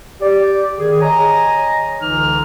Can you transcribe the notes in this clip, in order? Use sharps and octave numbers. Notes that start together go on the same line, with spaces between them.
G4 D5
D#3 G#4
C#5 D#5 G#5 A#5
C#2 D3 E3 D#4 F6